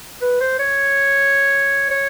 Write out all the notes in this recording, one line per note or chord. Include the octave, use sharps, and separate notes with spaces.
B4
C5
C#5
C#5